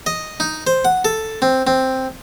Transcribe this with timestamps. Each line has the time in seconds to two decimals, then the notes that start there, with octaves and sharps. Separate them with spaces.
0.06 D#5
0.40 D#4
0.67 C5
0.85 F#5
1.05 A4
1.42 C4
1.67 C4